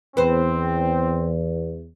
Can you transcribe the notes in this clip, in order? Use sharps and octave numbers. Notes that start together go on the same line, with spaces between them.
E2 C4 B4 C5